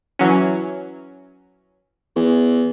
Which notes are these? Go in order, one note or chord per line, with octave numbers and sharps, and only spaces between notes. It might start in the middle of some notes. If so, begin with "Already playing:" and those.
E3 F#3 C#4
E2